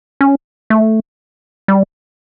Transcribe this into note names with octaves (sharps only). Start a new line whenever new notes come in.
C#4
A3
G3